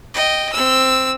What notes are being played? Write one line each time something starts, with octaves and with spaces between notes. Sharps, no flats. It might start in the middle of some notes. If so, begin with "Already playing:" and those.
D#5 G5
C4 E6